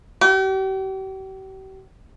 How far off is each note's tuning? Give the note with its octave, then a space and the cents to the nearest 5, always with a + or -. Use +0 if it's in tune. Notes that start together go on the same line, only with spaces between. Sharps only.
G4 -40